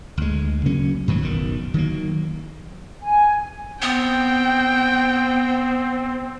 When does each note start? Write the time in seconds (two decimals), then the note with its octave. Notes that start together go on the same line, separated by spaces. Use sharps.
0.17 D2 G#3
0.66 C#3 F#3 A#3 C#4
1.08 G#2 D#3 E3 F#3
1.21 F#1 B1 D#3
1.74 D#3 F#3 A#3
3.03 G#5
3.82 B3 C4 G5